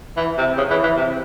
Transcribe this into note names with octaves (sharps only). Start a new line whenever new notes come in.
E3
C3
C#3
E3
E3
C3